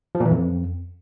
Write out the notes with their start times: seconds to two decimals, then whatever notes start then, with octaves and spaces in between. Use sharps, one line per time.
0.15 F3
0.20 A#2
0.26 E3
0.31 F2